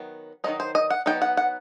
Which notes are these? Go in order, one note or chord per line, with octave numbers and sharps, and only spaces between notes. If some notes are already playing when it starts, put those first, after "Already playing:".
Already playing: D#3 F#3 B3
D#3 F#3 C4 D#4 D#5
C5
D#5
F#5
F#3 B3 D#4 G5
F#5
F#5